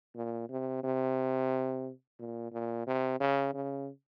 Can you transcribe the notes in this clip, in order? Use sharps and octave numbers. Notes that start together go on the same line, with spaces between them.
A#2
C3
C3
A#2
A#2
C3
C#3
C#3